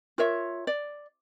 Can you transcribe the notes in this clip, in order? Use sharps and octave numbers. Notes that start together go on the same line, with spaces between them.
F4 A#4 C#5 E5
D5